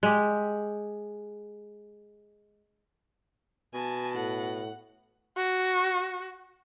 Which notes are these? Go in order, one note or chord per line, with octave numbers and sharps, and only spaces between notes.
G#3 G4
B2 G#5 A5
A2 F#5
F#4